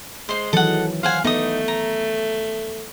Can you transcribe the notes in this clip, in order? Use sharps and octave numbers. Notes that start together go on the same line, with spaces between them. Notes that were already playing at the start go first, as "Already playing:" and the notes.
G#3 C5 C6
D#3 E3 F#3 A4 F#5
C5 F5 F#5 G#5
A3 B3 D#4 D#6
A#5